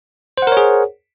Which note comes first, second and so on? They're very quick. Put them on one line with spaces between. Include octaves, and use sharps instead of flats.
C5 F#5 A#4 C#5 G#4